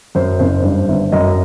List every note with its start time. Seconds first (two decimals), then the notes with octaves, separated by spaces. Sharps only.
0.15 F#2 C5
0.39 F#1 C5
0.63 G2 C5
0.88 G1
1.12 F#2 D#5